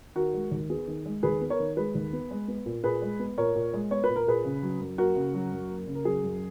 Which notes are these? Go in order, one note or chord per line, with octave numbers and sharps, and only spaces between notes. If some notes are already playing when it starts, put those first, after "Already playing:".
D#3 F#4 A#4
G#3
D#2
B3 G#4
D#3
G#3
D#2 G#4 B4
B3
A#4 C#5
D#3
G#3 G#4 B4
D#2
B3
G#3
B3
A#2
A#2 G#4 B4
G#3
B3
A#2 A#4 C#5
A#2
G#3
B3 C#5
B4
A#2
A#4
A#2 G#4 B4
C#3
F#3
F#2
A#3 F#4 A#4
C#3
F#3
F#2
A#3
C#3
A#4
F#3 G#4
F#2